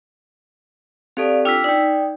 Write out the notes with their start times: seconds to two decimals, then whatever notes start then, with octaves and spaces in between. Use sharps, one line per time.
1.17 C4 G4 A4 D5 F5
1.45 D4 F4 G5 E6 B6
1.64 D#4 D5 G5